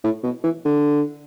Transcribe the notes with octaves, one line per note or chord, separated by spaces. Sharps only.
A2
B2
E3
D3